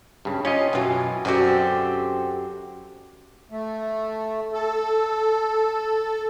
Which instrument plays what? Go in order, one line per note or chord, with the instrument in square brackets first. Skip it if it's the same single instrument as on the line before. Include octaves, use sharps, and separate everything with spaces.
[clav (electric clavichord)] G2 C#3
[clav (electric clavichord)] C#4 F4 D#5 [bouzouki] G4
[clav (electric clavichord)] F#2 F4 [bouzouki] B2 E3
[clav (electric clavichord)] F#2 F#4 [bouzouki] D3 C4 G4
[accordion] A3
A4